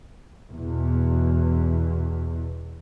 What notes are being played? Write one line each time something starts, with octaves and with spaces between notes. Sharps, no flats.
E2 B2